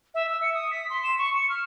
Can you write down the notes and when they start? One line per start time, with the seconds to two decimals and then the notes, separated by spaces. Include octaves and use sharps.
0.15 E5
0.29 E6
0.42 C#7
0.54 D#6
0.71 B6
0.90 C6
1.04 E7
1.18 C#6
1.35 C#7
1.49 F6